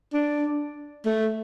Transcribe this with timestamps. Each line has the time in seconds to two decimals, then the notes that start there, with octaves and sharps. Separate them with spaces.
0.13 D4
1.06 A3